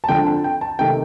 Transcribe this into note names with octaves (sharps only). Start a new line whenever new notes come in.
A5
D3 F3 C4 G5
A5
G5
A5
C3 D#3 A3 G5